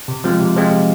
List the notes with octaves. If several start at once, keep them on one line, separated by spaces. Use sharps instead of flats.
C3
F3 G#3 C4 F4
C3
F3 G#3 C4 F4
C3